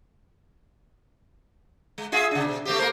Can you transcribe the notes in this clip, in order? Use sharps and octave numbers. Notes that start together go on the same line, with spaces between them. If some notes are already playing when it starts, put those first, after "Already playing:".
G#3
F4 G#4 E5
C#3 D4
B2
A3 C4 G4
A#3 A#4 C5